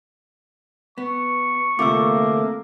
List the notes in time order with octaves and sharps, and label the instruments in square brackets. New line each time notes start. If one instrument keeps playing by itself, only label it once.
[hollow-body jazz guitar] B3 [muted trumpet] C#6
[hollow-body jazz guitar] D2 C3 F4 [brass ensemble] A3 A#3 [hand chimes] D6 E6